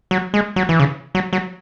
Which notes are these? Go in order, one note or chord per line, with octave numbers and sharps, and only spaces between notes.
F#3
G#3
F#3
E3
C#3
F#3
F#3